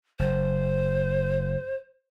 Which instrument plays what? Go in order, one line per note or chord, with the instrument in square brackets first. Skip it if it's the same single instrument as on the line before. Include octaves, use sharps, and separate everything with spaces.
[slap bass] F#1 [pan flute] C5